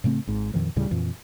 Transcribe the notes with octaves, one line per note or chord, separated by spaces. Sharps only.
A2 C#3 A3 C4
G#1 G#2
F2 A#2 D#3 F3
D2 A2 C#3 G3
F2 A#2 E3